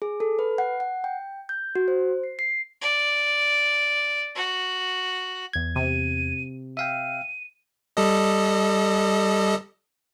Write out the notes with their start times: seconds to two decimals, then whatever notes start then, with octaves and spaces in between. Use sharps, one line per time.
0.02 G#4
0.20 A4
0.39 B4
0.58 F#5
0.80 F#5
1.04 G5
1.49 G6
1.75 F#4
1.88 C5
2.24 C7
2.39 C7
2.81 D5
4.35 F#4
5.53 E2 G#6
5.76 C3 D#7
6.77 E5 F5 G5 D#7
7.97 G3 A4 D#5